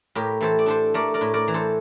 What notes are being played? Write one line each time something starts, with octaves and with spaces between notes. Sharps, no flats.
A2 G4 A#4
E3 A4 C5
D5
D4 A4 C5
A3 A#4 D5
A#4 D5
A2
A#4 D5
E3
A4 C5